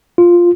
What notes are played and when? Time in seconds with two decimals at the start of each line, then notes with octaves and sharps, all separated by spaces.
0.18 F4